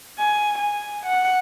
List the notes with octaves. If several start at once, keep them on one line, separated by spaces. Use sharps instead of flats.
G#5
G#5
F#5